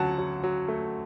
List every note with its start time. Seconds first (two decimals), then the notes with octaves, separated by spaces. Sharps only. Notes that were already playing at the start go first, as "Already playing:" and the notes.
Already playing: D2 C#3 F#3 F#5 A5
0.18 F#3
0.44 F#3
0.68 A3